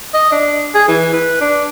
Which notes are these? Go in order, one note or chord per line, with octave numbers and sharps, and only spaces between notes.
D#5
D4
G#4
E3
B4
D4